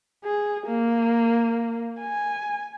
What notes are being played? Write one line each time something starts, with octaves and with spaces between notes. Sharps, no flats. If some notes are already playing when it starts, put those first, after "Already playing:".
G#4
A#3
G#5